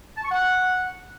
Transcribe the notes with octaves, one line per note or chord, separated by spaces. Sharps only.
A5
C#6
F#5